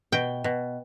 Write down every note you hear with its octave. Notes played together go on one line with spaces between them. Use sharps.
B2 G5
B2